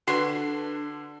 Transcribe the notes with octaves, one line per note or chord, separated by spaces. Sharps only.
D3 D4 F#4 B4 C6